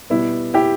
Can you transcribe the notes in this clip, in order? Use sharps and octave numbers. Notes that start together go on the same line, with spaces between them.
B2 G3 B3 E4
E4 G4